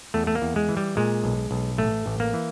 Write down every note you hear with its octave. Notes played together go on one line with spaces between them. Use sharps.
E2 A3
A3
A#3
E2
G#3
E3
G3
A#2 G#3
B1
B1
A1 A3
A1
A#3
E3